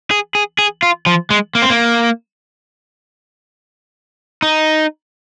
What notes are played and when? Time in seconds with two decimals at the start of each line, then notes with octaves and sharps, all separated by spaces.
0.11 G#4
0.35 G#4
0.59 G#4
0.82 F4
1.06 F3
1.30 G#3
1.55 A#3
1.62 C4
1.70 A#3
4.42 D#4